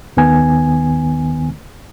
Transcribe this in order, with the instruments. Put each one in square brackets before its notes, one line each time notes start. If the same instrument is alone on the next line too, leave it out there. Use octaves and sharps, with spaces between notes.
[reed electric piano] D#2 D#3 B3 G#5